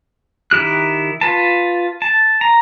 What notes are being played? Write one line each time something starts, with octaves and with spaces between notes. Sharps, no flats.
D#3 E4 G4 F#6
F4 B4 A5
A5
A#5